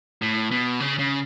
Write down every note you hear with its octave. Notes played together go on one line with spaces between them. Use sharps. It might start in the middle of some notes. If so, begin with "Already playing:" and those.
A2
B2
C#3
C#3